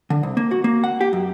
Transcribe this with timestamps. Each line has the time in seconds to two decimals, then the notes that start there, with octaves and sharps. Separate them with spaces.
0.10 D3
0.23 C2
0.37 A#3
0.51 F#4
0.64 A#3
0.84 F#5
1.01 G4
1.13 F#2